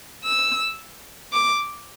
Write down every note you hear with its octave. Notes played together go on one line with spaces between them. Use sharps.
E6
D6